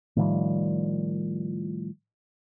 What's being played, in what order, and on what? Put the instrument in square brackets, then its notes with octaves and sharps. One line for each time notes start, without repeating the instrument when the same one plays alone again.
[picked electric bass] A2 D#3 F3 G3